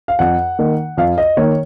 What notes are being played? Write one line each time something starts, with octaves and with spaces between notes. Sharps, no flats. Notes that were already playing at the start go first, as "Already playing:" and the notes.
F5
F2 F#5
D#3 A#3
F2 F5
D#5
D#3 A#3 C#5